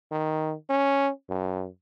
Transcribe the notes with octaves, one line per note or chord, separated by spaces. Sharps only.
D#3
C#4
F#2